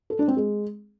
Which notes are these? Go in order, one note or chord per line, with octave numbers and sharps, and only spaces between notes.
A4
D4
C4
G#3